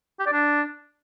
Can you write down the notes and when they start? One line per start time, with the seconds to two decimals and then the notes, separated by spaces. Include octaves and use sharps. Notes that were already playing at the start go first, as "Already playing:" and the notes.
0.20 G4
0.26 D5
0.33 D4